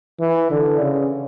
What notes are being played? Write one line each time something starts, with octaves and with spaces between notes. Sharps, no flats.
E3
D3
C#3